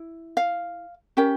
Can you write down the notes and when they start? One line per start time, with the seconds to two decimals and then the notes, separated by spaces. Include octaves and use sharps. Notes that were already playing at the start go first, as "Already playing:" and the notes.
Already playing: E4
0.37 F5
1.17 C#4 G4 A#4 G5